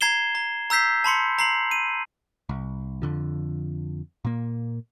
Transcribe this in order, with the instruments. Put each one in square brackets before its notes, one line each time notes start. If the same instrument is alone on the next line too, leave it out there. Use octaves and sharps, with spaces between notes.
[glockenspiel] A#5 G#6 C7 E7 G7
A#5
A#5 E6 G6 B6 C7
A5 B5 C6 C#7
A#5 C7 F#7
D#7
[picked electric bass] C2
F2 D3 F3
A#2 A#3